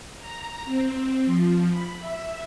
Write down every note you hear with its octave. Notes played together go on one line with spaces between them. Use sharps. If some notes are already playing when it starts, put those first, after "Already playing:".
A#5
C4
F3
B5
E5